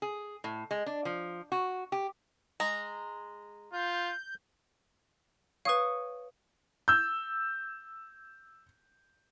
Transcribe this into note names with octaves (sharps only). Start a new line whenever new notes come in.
G#4
A2
G#3
D4
F3
F#4
G4
G#3 A#5
F4 G6
B4 C#5 F5 D#6
E6 G6